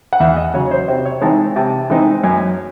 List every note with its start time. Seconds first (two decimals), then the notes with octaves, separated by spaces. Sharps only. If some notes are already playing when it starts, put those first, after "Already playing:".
0.13 F#5
0.20 E2 E5
0.36 D#5
0.54 C#3 F#3 C#5
0.71 C5
0.88 C3 C5
1.05 C#5
1.21 E3 G#3 C4 D#4 A5
1.56 C3 A5
1.90 E3 G#3 C4 D#4
2.24 F#2 G#5